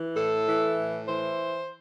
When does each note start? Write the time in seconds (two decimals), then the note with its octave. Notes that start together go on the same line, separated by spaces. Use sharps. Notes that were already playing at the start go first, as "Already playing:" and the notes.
Already playing: E3
0.16 A2 A4
0.47 E3
0.78 A2
1.08 E3 C5